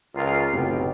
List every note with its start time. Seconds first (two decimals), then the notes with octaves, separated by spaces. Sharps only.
0.14 C#2 F4 A#4 A#5
0.53 F#1 B1 A2 C3 G5